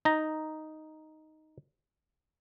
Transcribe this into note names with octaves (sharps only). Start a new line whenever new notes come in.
D#4 A#5